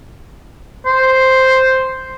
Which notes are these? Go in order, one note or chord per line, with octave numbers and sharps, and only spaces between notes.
C5